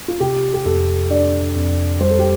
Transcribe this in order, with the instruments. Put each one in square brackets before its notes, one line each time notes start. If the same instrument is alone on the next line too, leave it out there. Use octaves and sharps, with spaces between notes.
[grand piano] F4
[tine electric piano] C3 [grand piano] G4
[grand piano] G4
[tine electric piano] F2 [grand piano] A4
[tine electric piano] D4 [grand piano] D5
[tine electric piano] F2
[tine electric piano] G3 [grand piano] C5
[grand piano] A4
G4